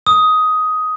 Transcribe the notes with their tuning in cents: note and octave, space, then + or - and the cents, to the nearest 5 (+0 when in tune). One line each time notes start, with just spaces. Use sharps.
D#6 +10